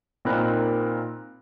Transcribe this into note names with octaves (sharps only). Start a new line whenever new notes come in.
A#2 C4 D#4 A#4 B5 F#6